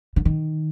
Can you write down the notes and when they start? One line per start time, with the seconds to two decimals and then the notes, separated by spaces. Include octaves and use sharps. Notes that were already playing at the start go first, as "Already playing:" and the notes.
0.16 D3
0.25 D#3